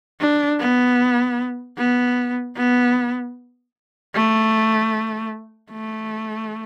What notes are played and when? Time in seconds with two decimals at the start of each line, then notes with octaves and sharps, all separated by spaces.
0.20 D4
0.60 B3
1.78 B3
2.57 B3
4.15 A3
5.72 A3